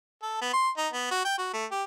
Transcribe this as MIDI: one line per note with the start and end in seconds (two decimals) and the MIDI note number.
0.22 0.41 69
0.41 0.49 59
0.53 0.69 84
0.77 0.88 63
0.93 1.09 59
1.11 1.23 66
1.25 1.37 79
1.38 1.49 66
1.53 1.65 57
1.71 1.83 67